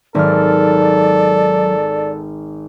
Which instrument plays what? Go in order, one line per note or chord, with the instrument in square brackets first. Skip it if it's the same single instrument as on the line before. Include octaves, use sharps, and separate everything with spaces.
[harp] G#1 F6 [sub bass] F#3 [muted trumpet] A4 [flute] D5